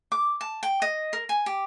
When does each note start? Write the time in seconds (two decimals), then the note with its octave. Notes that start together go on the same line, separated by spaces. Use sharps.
0.12 D6
0.41 A5
0.63 G5
0.82 D#5
1.13 A#4
1.29 G#5
1.46 G4